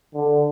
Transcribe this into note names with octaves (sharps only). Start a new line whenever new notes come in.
D3